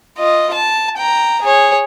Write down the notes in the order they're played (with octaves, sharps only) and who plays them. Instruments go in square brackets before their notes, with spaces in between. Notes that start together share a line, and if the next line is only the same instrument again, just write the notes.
[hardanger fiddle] F4 D#5
A5
G5 A#5
G#4 C#5